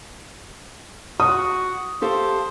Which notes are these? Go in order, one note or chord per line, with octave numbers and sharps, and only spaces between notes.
F#4 D#6
G4 A4 C5 F5